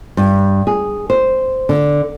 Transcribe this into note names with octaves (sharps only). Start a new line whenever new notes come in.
G2
G#4
C5
D3